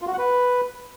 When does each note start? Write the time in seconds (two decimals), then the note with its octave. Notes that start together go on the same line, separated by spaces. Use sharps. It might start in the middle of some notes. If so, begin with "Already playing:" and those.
0.02 F4
0.07 F#4
0.13 F#5
0.18 B4